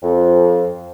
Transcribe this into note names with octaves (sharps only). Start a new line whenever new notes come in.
F2